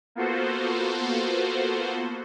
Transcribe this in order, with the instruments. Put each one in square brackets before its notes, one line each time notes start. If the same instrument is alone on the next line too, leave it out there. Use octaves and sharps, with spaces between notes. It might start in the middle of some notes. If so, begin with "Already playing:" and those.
[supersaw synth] A#3 B3 F4 F#4 A4 C5